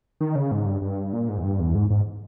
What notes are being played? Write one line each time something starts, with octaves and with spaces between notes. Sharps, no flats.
D#3
C#3
G#2
G2
G2
A#2
G#2
E2
G2
E2
G#2
G#2